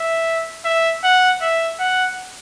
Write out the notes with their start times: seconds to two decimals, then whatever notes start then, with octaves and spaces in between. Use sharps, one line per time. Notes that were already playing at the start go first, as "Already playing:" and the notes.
Already playing: E5
0.65 E5
1.04 F#5
1.42 E5
1.80 F#5